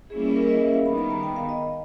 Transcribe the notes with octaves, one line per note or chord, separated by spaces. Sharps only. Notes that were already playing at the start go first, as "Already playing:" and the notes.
G3 A#3 C#4 E4 G#4
A#4
D#5
E5
F5
D#3 G3 B3 B5
B5
A#5
G5
F5
D#5